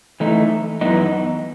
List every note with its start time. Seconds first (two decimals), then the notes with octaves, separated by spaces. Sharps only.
0.20 E3 A3 D#4
0.81 F#2 E3 B3 D#4